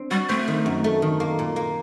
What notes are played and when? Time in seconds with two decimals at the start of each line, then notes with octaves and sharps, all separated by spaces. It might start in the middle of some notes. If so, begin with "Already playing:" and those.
Already playing: C4 D4
0.11 G3 F#4
0.29 A3 C4
0.48 D#3
0.66 F#2
0.84 A3
1.02 D#3
1.20 A#3
1.39 A#2
1.56 A#3